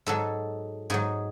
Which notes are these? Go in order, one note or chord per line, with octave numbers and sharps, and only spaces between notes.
G#2 F#3 A4
G#2 F#3 G#4